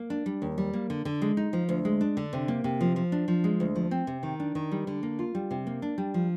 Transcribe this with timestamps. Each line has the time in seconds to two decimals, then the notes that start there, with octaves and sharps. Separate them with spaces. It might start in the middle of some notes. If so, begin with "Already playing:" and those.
Already playing: A#3
0.10 D4
0.26 G3
0.42 D#2
0.58 G3
0.73 A#3
0.90 D3
1.05 D3
1.22 G#3
1.37 D#4
1.53 F3
1.69 D2
1.85 G#3
2.01 D4
2.17 D3
2.33 C3
2.48 A#3
2.64 C3
2.81 F3
2.96 F3
3.12 D4
3.28 F3
3.44 G#3
3.60 D2
3.75 F3
3.91 C4
4.07 C3
4.23 D#3
4.40 D4
4.55 D#3
4.72 G3
4.87 D3
5.03 A#3
5.19 F4
5.35 G3
5.51 C3
5.67 A#3
5.82 D4
5.98 G3
6.14 F3